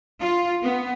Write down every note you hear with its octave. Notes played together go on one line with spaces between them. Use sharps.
F4
B3